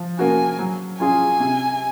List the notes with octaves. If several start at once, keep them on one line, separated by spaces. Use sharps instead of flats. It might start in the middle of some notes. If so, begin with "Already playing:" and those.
Already playing: F3
A#3 C#4 F#4 G#5
F#3
C#4 F4 G#4 G#5
C3